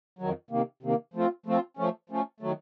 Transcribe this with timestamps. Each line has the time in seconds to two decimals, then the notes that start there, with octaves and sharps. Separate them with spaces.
0.19 F2 D#3 F#3
0.51 C3 D#3 A#3
0.83 C3 D#3 A#3
1.14 F3 A3 C4 F4
1.46 F3 A3 C4 F4
1.77 F3 A3 C#4
2.10 F3 A3 C#4
2.40 D#3 F#3 A3